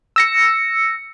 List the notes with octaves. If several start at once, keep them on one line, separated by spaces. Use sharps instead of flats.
E6 A#6 C#7